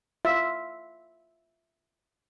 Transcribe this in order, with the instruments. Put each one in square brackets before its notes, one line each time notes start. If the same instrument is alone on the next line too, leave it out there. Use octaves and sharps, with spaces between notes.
[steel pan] F4 E5